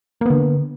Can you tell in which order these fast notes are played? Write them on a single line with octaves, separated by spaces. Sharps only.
A#3 B3 D3